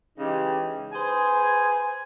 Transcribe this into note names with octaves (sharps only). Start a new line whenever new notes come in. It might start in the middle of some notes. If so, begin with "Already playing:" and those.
C#3 E3 G#3 D#4 G4
G#4 B4 C5 G#5